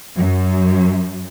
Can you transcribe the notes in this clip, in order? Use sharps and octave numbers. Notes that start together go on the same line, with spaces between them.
F#2